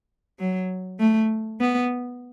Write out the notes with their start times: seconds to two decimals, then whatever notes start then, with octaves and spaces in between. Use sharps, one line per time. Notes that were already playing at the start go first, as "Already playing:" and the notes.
0.39 F#3
1.00 A3
1.60 B3